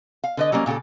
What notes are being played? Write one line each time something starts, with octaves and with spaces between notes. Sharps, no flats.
F5
D3 B4 D#5
F#3 G3 A#3 C#4
A#2 C#3 F#4 G4 A4